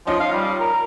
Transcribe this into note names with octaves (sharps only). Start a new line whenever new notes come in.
F3 C#4 D#4 F4
F5
G3
A#4